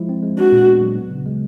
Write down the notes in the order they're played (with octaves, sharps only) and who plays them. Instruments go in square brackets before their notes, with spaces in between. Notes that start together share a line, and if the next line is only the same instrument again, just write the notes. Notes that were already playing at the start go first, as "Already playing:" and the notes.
Already playing: [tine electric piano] F3 G#3 E4
C4
G#3
[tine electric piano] D4 [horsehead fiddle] F#4
[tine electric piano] A#2
B3
F#3
B3
C#3
G#3